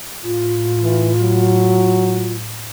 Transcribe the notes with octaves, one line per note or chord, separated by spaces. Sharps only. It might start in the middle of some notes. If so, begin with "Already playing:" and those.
A2 F4
E3
F#3